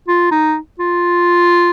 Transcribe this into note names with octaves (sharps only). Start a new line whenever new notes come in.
F4
D#4
F4